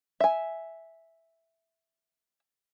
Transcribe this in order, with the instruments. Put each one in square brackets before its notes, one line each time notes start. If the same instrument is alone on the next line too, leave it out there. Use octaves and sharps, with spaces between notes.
[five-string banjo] E5 G#5